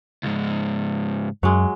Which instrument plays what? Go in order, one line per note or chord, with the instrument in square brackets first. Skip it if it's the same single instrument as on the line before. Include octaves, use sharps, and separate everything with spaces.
[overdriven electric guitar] C#2 G#2
[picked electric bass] F#2 [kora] F#3 G#3